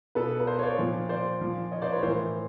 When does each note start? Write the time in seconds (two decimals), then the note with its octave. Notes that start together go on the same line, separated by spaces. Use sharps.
0.15 B2 A4 B4
0.40 B4
0.47 A#4 C5
0.59 C#5
0.63 C5 D5
0.78 A#2 F3
1.09 C5 D5
1.41 A#2 F3
1.72 C#5 D#5
1.82 C5 D5
1.92 B4 C#5
2.02 A2 E3 A#4 C5